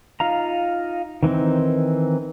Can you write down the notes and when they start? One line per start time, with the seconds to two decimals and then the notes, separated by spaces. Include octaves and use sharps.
0.20 D#4 F4 F5 A#5
1.23 D#3 E3 C4 D#4